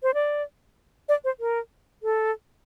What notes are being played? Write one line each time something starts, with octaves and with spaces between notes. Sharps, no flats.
C5
D5
D5
C5
A#4
A4